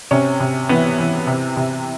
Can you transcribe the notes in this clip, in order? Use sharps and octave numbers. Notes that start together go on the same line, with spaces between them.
C3 C#4
C3
E3 B3
E3
C3
C3